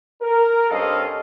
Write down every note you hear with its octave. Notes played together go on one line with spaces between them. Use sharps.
A#4
G2 C4 C#4 A4 D#5 F5